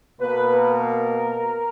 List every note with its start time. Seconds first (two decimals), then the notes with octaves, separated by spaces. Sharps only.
0.20 B2 A#3 B4
0.56 A#4